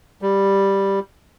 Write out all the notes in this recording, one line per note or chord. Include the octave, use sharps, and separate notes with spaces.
G3